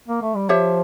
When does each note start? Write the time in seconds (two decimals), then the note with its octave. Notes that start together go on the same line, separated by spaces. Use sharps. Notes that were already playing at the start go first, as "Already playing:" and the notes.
0.08 A#3
0.22 A3
0.36 G3
0.49 F3 G4 C#5 E5